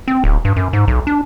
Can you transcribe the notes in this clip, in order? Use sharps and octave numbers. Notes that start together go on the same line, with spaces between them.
C4
D1
G2
F#2
G#2
B1
D4